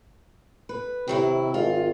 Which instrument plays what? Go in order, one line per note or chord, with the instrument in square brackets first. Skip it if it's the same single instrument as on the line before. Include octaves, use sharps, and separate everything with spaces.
[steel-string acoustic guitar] B4
[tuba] C3 [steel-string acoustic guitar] D#3 F#3 E4
[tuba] G#1 [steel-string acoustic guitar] F4